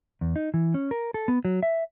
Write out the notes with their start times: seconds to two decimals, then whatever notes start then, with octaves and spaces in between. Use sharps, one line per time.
0.21 E2
0.36 D#4
0.54 E3
0.74 C#4
0.91 A#4
1.14 A4
1.28 B3
1.45 F#3
1.63 E5